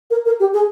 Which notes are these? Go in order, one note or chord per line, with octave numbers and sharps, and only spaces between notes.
A#4
A#4
G4
G#4